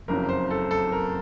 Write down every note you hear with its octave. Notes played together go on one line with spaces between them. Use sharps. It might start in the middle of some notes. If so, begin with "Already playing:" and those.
F#1 F2 C#3 F#3 A#4
C5
A4
A4
A#4